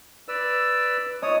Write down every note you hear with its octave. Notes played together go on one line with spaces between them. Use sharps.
B4 D5 E6
C#5 D#5 D#6